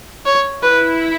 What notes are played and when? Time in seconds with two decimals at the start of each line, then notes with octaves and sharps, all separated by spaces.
0.26 C#5
0.63 E4 B4